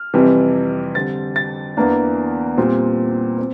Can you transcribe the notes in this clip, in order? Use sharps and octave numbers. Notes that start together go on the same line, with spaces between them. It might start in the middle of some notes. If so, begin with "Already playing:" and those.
Already playing: F6
F2 C3 E3 G3
D3 G3 C4 A6
A6
E2 E3 A#3 D4
A#2 G3 C4
C4